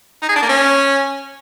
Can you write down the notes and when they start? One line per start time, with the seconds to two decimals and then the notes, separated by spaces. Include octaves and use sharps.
0.22 D#4
0.29 G#4
0.36 D4
0.42 A#3
0.49 C#4